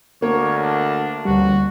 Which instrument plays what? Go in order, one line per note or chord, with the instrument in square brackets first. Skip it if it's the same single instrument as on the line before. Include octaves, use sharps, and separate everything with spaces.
[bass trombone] D2 [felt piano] A#3 [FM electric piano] A#4 [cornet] C#5
[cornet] D4
[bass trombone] A1 [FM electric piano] D2 G3 [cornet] F#4